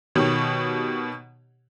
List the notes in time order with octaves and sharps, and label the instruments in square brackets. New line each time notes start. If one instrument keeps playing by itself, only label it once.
[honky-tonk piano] B2 D#3 G4 C#5